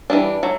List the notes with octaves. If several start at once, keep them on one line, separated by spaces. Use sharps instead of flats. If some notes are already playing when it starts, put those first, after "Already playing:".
E3 G3 D4
F#3 A3